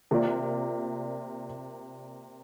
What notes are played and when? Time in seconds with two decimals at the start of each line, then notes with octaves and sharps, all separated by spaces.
0.11 C3 A#3 F4 D5